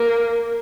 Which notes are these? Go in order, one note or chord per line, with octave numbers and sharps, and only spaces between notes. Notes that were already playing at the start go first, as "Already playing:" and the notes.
Already playing: A#3